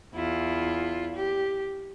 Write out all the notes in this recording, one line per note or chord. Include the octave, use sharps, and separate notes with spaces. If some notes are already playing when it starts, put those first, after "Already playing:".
E2 E4 F4
G4